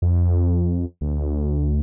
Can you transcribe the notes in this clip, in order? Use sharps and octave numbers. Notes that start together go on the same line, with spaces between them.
F2
D2